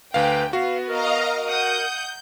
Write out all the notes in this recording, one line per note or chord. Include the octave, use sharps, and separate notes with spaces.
D2 B4 F5 G5
B3 F#4 F5
A#4 D#5 F5 A#5
F#5 D#6 G6